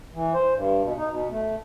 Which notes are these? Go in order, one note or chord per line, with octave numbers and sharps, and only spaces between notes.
E3
C5
G2
B2
D#4
B2
A3